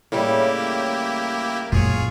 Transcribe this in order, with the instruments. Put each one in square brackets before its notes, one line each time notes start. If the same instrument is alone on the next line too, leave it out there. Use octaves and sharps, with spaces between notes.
[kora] A2 C#3 G3 [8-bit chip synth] A#3 E4 G4
[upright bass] F#2 [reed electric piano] A#2 [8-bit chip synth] F4 G#4 C#5